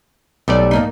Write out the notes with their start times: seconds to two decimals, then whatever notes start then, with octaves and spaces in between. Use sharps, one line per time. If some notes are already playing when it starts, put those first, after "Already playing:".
0.48 B1 G3 A3 G4 D5
0.71 G#2 A#3 D#4